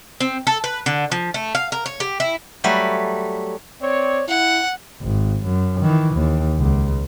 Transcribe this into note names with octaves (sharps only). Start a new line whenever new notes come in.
C4
A4
B4
D3
F3
A3
F5
A#4
C#5
G4
E4
F#3 G3 A3 B4
C4 C#5 D5
E4 F#5
G#1
F#2
D#3 E3
D#2
C#2